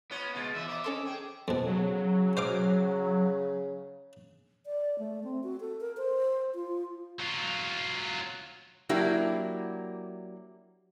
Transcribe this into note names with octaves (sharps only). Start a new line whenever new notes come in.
B3 C#4 F4 C#5
B2 G#3 F4
E3 F#4 E5
F2 A#4 D#5 D6
C#4 A4 C6
G#4 G5
F2 B2 A4
C#3 F#3
C5 F5 D6
D5
A3
C4
F#4
A4
A#4
C5
F4
F#3 F4
F#3 A#3 D4 E4 G4